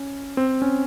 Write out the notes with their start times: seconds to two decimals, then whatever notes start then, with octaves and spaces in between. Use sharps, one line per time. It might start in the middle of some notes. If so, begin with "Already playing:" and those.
Already playing: C#4
0.37 C4
0.62 C#4